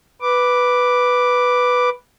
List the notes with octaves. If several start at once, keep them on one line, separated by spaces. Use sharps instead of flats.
B4 D6